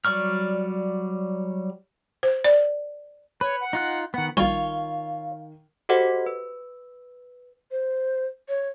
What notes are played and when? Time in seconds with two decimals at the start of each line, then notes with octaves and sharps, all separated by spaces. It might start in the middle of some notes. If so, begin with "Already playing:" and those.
0.05 F#3 G3 D5 C#6 F6
2.23 C5
2.44 D5
3.41 B4 C#5
3.61 F#5
3.73 D#4 F4 F#6
4.14 D#3 B3 F#5
4.37 A#1 D#3 G3 F4 C#5 F5 G7
5.89 F#4 G4 A4 C5 D#5 F#5
6.26 B4
7.71 C5
8.49 C#5